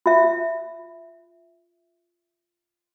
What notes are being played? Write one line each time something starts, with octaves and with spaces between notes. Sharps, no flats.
F4 E5